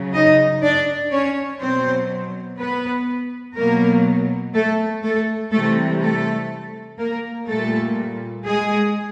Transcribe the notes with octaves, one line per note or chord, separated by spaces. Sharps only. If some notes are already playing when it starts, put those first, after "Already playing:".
Already playing: C#3 F#3
D#4 D#5
D4 D5
C#4 C#5
B2 F#3 C4 C5
B3 B4
B2 F#3 A#3 A#4
A3 A4
A3 A4
C3 E3 G3 A3 A4
A3 A4
A#3 A#4
A#2 G3 A3 A4
G#3 G#4